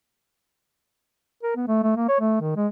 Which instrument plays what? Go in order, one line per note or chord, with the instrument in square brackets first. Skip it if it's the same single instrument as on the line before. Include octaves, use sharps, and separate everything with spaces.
[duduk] A#4
B3
A3
A3
A#3
C#5
A3
D#3
G#3